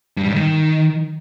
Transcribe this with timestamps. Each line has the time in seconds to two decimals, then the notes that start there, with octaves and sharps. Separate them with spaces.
0.17 G2
0.23 G3
0.28 G#2
0.34 D#3